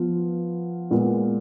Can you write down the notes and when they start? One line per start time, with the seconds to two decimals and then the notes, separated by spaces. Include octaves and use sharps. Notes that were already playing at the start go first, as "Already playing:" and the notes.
Already playing: F3 B3 F4
0.91 A#2 G#3 B3